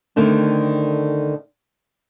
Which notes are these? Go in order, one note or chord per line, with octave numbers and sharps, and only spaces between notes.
D3 D#3 A3 C4